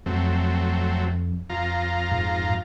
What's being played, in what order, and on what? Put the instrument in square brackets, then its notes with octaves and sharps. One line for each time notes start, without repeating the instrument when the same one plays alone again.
[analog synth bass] F2 [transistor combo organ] F#3 A3 C4
[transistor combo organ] F2 F4 A#5
[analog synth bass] G#2